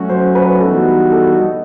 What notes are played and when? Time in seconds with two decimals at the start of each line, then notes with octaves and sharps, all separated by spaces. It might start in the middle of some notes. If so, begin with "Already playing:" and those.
Already playing: F#3 A3 C#4 F#4
0.10 C5
0.35 B4
0.60 E3 G3 B3 D#4 F#4 A4
1.12 A4
1.38 D#5